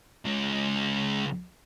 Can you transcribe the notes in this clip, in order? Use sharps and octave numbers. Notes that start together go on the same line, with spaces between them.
C#2 G#3